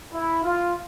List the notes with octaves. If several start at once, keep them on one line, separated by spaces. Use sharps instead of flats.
E4
F4